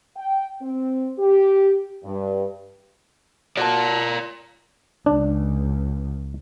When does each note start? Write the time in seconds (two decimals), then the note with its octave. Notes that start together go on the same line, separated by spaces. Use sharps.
0.17 G5
0.62 C4
1.19 G4
2.04 G2
3.57 F#4 A#4 D5 A5
5.06 C#2 D4